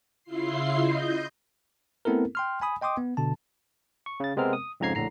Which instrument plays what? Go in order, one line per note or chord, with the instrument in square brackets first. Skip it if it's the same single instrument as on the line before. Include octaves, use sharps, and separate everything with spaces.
[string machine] C#3 E4 F4 C6 C7
D#5 G6
[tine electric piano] A3 B3 C4 E4 A4 A#4
G5 C6 F6
G#5 B5 D#6
D#5 G5 C6 D6 D#6
B3
B2 D3 A5
C#6
C#3 A6
C3 G#3 B3 C4 A#4 F6
D#6
F2 G#2 C#3 A#5 G#6 C7
A#1 A2 D3 A#5 C7